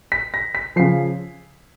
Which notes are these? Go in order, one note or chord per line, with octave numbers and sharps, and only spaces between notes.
B6
A#6
B6
C#3 F3 C7